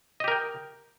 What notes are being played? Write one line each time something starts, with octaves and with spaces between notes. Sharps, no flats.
G4 A#4 D#5 G5